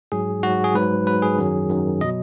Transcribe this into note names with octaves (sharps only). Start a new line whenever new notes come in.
G#2 F#3 G#4
G#2 F#3 F#4
G#4
G#2 F#3 B4
G#2 F#3 B4
G#4
F#2 D#3 F#3
F#2 D#3 F#3
B2 F#3 D#5